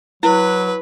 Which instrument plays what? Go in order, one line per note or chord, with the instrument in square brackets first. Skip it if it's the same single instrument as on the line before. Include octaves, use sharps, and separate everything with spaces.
[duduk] F#3 [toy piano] E4 [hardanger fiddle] B4